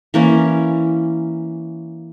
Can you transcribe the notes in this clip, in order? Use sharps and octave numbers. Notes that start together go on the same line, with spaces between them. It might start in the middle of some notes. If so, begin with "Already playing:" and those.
E3 A#3 C#4